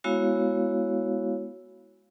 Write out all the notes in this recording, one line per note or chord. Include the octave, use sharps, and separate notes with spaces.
G#3 B3 E4 F#4 C#5 F5